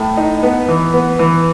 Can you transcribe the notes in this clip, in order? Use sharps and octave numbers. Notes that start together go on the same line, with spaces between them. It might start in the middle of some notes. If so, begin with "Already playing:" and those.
Already playing: A2
D#4
B3
E3
B3
E3